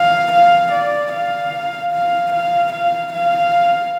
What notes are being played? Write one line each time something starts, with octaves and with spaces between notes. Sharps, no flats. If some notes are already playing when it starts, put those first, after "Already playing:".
Already playing: F5
F5
D5
F5
F5
F5
F5
F5